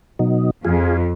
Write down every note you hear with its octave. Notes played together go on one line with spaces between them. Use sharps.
B2 F#3 D#4
F2 F4 G#4